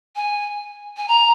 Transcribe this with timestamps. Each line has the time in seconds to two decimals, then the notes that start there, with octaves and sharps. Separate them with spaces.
0.16 G#5
0.97 G#5
1.08 A#5